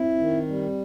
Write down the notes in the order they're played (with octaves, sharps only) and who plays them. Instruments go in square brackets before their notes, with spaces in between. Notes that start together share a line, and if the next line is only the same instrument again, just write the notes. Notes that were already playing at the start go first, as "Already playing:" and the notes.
Already playing: [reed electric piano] C4 [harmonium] E4
[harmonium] D#3
G3